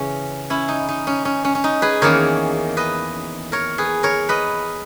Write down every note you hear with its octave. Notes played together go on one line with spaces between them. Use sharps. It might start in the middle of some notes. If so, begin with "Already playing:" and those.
Already playing: C#3 E3 C#4
C#4 E4
D#4
D#4
C#4
C#4
C#4
C#4
D#4
G#4 B4
E2 D#3 A#3 C#4 A#4 C#5
B4 D#5
A#4 C#5
G#4 B4
A#4 C#5
B4 D#5